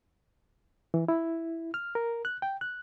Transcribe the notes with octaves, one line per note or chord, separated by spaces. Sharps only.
E3
E4
F6
A#4
F#6
G5
F#6